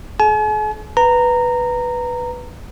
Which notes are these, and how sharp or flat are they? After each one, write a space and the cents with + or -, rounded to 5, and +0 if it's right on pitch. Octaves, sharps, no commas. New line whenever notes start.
G#4 +45 G#5 +45
B4 +0 A#5 -15